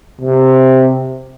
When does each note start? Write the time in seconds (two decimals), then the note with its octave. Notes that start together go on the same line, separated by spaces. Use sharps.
0.21 C3